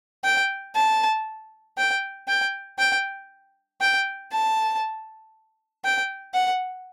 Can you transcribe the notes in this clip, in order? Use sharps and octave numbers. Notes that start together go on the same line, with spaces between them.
G5
A5
G5
G5
G5
G5
A5
G5
F#5